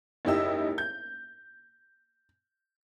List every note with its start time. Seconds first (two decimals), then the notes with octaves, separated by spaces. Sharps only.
0.25 F#1 G#2 E4 G4 D#5 E6
0.78 G6